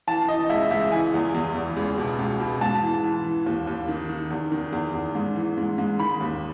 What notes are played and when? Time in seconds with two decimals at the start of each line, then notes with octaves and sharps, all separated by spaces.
0.07 E3 A5
0.28 E3 D#5
0.50 C#2 E5
0.71 C#2 E5
0.92 E3 G#5
1.14 E2
1.34 E2
1.55 E2
1.77 C#2
1.98 B2
2.19 C#2
2.40 B2
2.61 G#2 A5
2.82 E3
3.04 E3
3.24 E3
3.46 D#2
3.67 D#2
3.88 D#3
4.09 D#3
4.30 E2
4.52 D#3
4.73 E2
4.94 E2
5.15 G#2
5.36 E3
5.58 G#2
5.78 G#2
6.00 D#3 B5
6.21 D#2